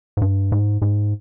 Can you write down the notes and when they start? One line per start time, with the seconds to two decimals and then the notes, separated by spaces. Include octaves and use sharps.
0.17 G#2
0.22 G2
0.52 G#2
0.82 G#2